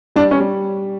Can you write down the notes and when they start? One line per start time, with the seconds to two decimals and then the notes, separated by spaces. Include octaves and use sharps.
0.16 G3 D4
0.31 C#4
0.40 G3